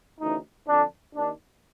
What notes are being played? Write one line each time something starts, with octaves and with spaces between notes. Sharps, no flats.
D2 C#3 E3 D#4
F2 D3 D4
D#2 D#3 D4